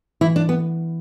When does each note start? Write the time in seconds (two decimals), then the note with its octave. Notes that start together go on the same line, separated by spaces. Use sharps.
0.21 E3 E4
0.36 D4
0.49 B3